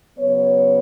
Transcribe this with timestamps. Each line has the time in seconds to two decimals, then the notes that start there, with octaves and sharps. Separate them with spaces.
0.19 C#3 F#3 B3 C#5